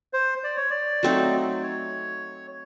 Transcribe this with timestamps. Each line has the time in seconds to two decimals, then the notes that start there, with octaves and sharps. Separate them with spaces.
0.13 C5
0.43 D5
0.57 C#5
0.70 D5
1.03 F#3 A3 C4 D#4
1.63 C#5